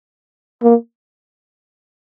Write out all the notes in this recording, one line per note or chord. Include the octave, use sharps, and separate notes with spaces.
A#3